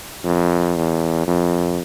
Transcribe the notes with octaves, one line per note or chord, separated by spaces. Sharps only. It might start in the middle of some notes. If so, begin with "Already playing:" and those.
F2
E2
F2